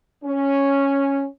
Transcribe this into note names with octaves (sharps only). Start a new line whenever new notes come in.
C#4